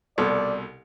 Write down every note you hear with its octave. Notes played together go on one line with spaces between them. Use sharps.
C2 B2 A4 D5